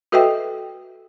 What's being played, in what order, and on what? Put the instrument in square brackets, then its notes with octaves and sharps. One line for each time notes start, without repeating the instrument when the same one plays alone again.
[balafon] F#4 A4 B4 D#5 E5 G5